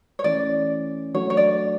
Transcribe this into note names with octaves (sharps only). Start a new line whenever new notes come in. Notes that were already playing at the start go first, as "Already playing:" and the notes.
C#5
E3 A3 C#4 D5
F#3 A3 D4 F#4 C#5
C#5
D5